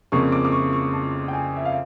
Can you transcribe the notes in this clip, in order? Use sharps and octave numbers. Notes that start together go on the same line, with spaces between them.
F2 C#3 F3 A#3 C#6
D6
D6
C#6
C#6
A5
G5
G#5
E5
F5